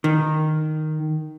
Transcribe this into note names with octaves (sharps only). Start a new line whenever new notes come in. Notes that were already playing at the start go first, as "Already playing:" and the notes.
D#3